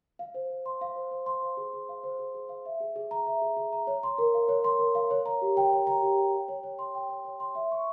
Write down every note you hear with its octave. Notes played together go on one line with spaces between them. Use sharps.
F5
C5
C5
C6
F5
C5
C5
C6
C5
G#4
G#4
F5
C5
G#4
G#4
F5
E5
G#4
G#4
A#5
E5
G#4
G#4
A#5
C#5
C6
A#4
F5
C#5
C6
A#4
F5
C#5
A#5
G4
G5
C#5
A#5
G4
G5
G5
C#5
C#5
C6
G5
C#5
C#5
C6
E5
C#6